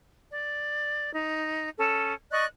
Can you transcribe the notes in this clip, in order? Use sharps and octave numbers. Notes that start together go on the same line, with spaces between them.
D5
D#4
C#4 A4
D5 D#5 C#6 F#6